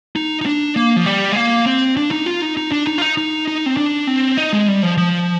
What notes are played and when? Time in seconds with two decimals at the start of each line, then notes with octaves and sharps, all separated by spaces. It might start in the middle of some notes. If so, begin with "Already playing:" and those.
0.16 D#4
0.41 D#4
0.46 D4
0.76 A#3
0.96 F3
1.06 G3
1.32 G#3
1.36 A#3
1.66 C4
1.97 D4
2.11 D#4
2.26 F4
2.42 D#4
2.57 D#4
2.72 D4
2.87 D#4
2.98 F4
3.02 D#4
3.18 D#4
3.48 D#4
3.66 C4
3.77 D4
4.07 C4
4.37 D#4
4.53 G#3
4.68 G3
4.83 F3
4.97 F3